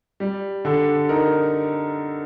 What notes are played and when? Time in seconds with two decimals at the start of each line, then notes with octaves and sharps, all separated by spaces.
0.20 G3
0.65 D3 A4
1.09 D#4 A#4